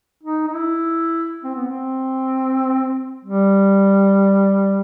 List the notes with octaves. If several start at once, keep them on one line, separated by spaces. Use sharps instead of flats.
D#4
D#4
E4
C4
B3
C4
G3